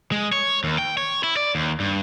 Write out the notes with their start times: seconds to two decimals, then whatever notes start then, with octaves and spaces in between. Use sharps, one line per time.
0.12 G#3
0.33 C#5
0.64 D#2
0.79 G5
0.97 C#5
1.24 E4
1.37 D5
1.55 D#2
1.80 G2